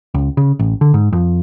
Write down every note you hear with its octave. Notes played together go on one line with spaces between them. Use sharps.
C#2
C#3
A1
D3
G#2
F2